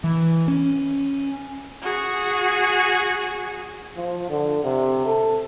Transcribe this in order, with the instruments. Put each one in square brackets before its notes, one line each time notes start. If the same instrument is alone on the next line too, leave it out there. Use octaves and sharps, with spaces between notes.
[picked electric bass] E3
C#4
[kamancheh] F#4 G#4
[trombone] F3
D3
C3
A4